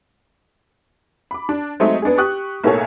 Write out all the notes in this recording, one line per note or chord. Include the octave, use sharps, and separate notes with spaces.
B5 D6
D4
F#3 G#3 A3 C4 D#4
B3 D4 D#4 G#4
G4 C#6 D#6 F#6
B1 A2 A#3 G#4 A4 C#5